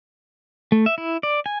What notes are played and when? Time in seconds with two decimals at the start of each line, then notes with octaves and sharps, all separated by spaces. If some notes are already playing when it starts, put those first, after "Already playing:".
0.72 A3
0.86 E5
0.98 E4
1.23 D5
1.46 G#5